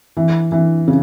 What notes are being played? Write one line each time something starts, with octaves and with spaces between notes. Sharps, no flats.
E3
E3
C#3